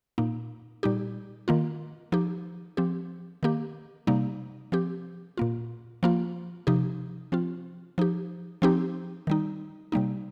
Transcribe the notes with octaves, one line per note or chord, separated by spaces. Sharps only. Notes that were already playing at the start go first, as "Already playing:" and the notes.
A#2 A#3 D#4
A#2 G3 D#4 G4
D#3 A#3 F4
F3 D#4 G4
F3 C4 G4
D#3 A#3 G4
C3 G3 A#3 D#4
F3 C4 G4
A#2 A#3 F4
F3 A#3 F4
C3 F3 D#4 G4
F3 C4 F4
F3 D#4 G4
F3 C4 D#4 G4
D#3 G3 D#4
C3 G3 A#3 D#4